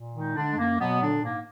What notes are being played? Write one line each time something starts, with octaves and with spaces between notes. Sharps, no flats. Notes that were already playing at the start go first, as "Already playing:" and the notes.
Already playing: A#2
D#3 G#3 D#4
D3 G#3 D4
G#3
F#2 A#3
B2 F#3 B3
A#2 D3 D4
G#2 A#3